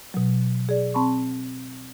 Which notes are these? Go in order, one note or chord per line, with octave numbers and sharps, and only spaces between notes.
B2 F#3
G#4 D5
C4 A5 B5 C#6